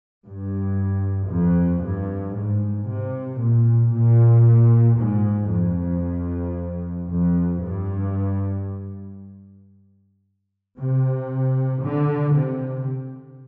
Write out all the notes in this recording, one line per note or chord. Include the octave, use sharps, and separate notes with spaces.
G2
F2
G2
G#2
C3
A#2
A#2
G#2
F2
F2
G2
C3
D3
C3